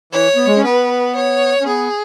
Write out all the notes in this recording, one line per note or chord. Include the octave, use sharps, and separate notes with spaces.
E3 C#5
B3
G#3
C#4
B3 B4
C#5
C#4
B3 G#4